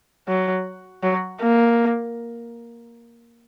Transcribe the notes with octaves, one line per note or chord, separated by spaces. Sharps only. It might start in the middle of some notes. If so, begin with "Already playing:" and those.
F#3
F#3
A#3